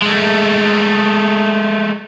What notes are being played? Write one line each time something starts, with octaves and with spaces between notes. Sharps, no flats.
G#3 A3